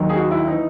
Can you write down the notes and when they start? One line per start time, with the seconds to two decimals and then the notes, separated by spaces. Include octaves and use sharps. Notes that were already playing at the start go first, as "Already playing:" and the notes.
Already playing: D#2 D#3 F#3
0.09 G#4
0.16 F#4
0.31 E4
0.47 E3 D#4